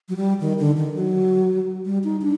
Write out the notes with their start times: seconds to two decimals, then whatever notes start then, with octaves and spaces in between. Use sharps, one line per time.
0.09 F#3
0.17 G3
0.40 D#3
0.59 D3
0.77 D#3
0.95 F#3
1.86 G3
2.04 D#4
2.21 D4